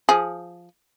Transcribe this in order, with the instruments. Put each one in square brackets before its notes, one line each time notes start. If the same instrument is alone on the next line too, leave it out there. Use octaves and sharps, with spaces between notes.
[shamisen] F3 G#4